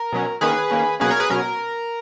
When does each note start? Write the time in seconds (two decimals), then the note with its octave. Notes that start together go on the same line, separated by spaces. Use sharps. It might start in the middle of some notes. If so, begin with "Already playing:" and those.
Already playing: A#4
0.12 B2 F#3 C#4
0.41 D#3 A#3 C#4 G#4 B4
0.70 D#3 A#3 C#4
1.00 B2 F#3 A#3 C#4 G#4 B4
1.10 A#4 C#5
1.20 G#4 B4
1.30 B2 F#3 C#4 A#4